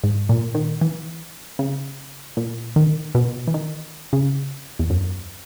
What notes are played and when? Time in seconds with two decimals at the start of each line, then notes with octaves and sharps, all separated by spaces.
0.04 G#2
0.29 A#2
0.55 D#3
0.81 E3
1.59 C#3
2.37 A#2
2.76 D#3
3.15 B2
3.48 E3
3.54 D#3
4.13 C#3
4.79 E2
4.90 F#2